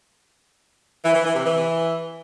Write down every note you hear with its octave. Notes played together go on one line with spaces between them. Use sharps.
E3
E3
E3
C3
E3